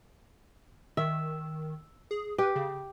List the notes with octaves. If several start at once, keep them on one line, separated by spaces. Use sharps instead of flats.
D#3 E5
G#4
G4 B4
C#3